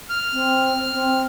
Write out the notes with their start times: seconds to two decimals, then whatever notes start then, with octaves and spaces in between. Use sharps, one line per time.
0.09 F6
0.33 C4
0.92 C4